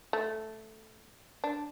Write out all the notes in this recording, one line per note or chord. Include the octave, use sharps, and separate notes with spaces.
A3
D4